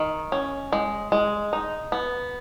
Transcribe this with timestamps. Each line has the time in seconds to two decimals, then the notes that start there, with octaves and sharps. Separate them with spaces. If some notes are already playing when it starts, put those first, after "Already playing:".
Already playing: D#3
0.32 C#4
0.72 G#3
1.12 G#3
1.53 D#4
1.92 B3